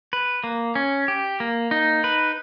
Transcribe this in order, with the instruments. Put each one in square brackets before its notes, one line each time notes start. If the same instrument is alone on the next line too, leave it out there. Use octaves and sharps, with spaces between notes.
[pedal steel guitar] B4
A#3
C#4
G4
A#3
D#4
B4